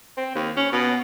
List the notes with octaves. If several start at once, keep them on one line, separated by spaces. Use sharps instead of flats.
C4
D#2
C#4
B2